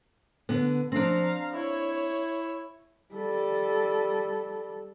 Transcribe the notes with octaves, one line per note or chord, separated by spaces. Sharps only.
D3 B3
F3 C4 D4 F5 A#5
E4 C#5
G3 A4